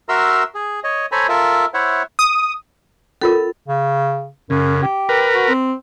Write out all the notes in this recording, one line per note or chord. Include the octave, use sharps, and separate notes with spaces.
F#4 A#4 E5 A#5 C6 E6
G#4
C#5 D#5
A4 C5 C#5 G#5 A#5 B5
F4 A4 A#4 E5
E4 C5 C#5 E5 F#5
D#6
C#4 F4 A4 A#4
C#3
F#2 C#3
G4
A#4 B4
F#4
C4